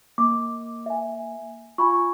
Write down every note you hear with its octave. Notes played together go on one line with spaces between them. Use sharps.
A#3 D6
E5 G#5
F4 G#5 B5 C#6